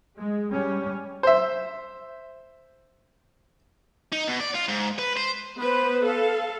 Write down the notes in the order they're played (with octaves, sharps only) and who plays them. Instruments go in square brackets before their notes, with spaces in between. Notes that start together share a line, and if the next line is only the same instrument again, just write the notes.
[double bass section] G#3
G3 C#4
[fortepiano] C5 E5
[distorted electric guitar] D#4
B2
D5
F4
G#2
B4
C5
[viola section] B3 B4 C5
A4 F5